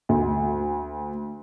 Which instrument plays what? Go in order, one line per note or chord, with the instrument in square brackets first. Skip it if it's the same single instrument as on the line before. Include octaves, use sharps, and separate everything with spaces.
[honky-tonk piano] D2